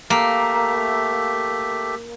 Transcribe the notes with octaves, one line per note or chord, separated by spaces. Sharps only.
A3 A#3 G4 E5